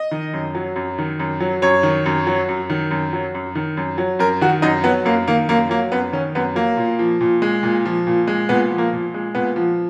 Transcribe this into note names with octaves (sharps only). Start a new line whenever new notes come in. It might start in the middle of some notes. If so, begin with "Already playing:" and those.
Already playing: D#5
D#3
F#2
F#3
F#2
D#3
F#2
F#3
F#2 C#5
D#3
F#2
F#3
F#2
D#3
F#2
F#3
F#2
D#3
F#2
F#3
F#2 A#4
D#3 F#4
F#2 D#4
F#3 B3
F#2 A#3
D#3 A#3
F#2 A#3
F#3 A#3
F#2 B3
D#3 C#4
F#2 B3
F#3 A#3
A#2
F3
A#2
G#3
A#2
F3
A#2
G#3
A#2 B3
F3
A#3
A#2
G#3
A#2 B3
F3